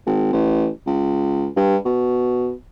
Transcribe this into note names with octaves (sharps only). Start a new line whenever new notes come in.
G#1
A1
C#2
G2
B2